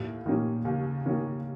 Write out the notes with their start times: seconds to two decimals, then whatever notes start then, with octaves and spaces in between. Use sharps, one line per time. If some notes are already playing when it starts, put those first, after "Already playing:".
Already playing: D#2 A2
0.26 A#2 D#3 A#3 C#4
0.65 D#2 C#3
1.05 D#3 A#3 C#4